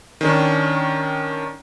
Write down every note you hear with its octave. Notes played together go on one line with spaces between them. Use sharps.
D#3 C#4 D4